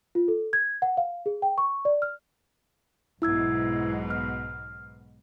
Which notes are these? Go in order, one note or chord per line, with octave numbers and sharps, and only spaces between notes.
F4
A4
G#6
F#5
F5
G#4
G5
C#6
D5
F6
B1 G#2 B2 E4 E6 G#6
F6